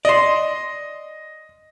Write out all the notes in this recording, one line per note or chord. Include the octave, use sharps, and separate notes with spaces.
D5 D#5 C6